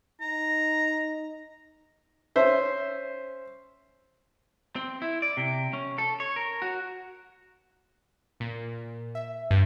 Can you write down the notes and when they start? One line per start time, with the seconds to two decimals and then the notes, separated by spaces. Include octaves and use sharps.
0.21 D#4 A#5
2.36 C#4 C5 E5
4.76 C4
5.02 E4
5.22 D5
5.37 C3
5.73 C#4
5.98 A4
6.20 C#5
6.36 A#4
6.62 F#4
8.40 A#2
9.15 E5
9.51 G2